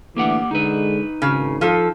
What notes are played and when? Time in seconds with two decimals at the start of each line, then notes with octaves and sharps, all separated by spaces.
0.16 D3 E3 A3 A#3 G4 F#5
0.51 D3 G#3 D#4 B4
1.22 G#1 C#3
1.61 F3 A4